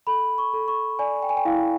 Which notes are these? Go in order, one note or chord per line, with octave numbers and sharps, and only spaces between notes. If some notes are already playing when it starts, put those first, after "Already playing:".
A4 B5
C#6
A4
C#6
D5 G#5
G5
G#5
G5
E4 F5